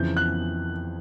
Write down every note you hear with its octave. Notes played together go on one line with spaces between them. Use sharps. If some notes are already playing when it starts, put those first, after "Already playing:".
Already playing: F2 C#3 E3 G6
F#6